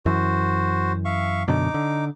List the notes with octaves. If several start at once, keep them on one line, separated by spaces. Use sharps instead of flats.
F#2 E3 F#4 C5
E5 F5 C#6
F#2 B2 D3 D#4 D6
D3